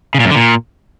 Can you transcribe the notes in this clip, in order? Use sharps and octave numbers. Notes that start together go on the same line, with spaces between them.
C#3
A#2
F#2
D3
A#2